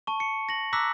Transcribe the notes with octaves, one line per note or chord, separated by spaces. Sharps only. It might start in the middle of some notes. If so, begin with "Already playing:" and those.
A5 C#6
C#7
A#6 F#7
A#5 D6 E6 F#6 A#6 B6